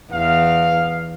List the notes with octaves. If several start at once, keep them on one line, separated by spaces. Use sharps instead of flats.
E2 F5